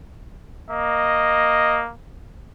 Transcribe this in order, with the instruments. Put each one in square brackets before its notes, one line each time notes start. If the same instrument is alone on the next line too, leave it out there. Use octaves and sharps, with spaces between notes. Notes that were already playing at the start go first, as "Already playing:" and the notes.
[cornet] A#3 [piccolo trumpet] D#5